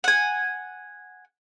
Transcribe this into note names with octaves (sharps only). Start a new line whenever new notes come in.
F#5 G#5